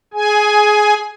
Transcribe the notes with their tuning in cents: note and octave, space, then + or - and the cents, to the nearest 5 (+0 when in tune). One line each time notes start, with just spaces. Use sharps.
G#4 +15 G#5 +5